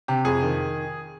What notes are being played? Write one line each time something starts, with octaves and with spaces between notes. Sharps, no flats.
C3 G4
F2 G#4
D#3